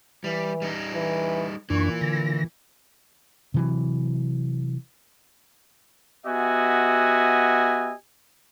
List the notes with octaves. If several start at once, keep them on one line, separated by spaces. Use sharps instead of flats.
E3 G3
G3 D#4
E3
F#2 A#2 E3 D4 C#6
D3 A#6
C3 E3 F#3
B3 F#4 G4 D#5 E5 G#5